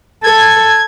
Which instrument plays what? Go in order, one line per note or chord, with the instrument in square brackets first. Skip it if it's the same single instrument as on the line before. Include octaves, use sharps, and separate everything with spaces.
[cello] A4 [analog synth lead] G#6